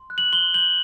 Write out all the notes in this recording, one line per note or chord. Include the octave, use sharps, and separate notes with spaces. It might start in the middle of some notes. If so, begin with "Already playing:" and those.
Already playing: C6
F#6
F#7
C6 G7
G6 F#7